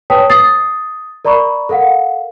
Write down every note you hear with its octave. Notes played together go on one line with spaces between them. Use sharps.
B4 C#5 G5 A5 D#6 B6
D#6 A6 C7
A#4 D5 A#5 B5 C#6
A4 A#4 F5 F#5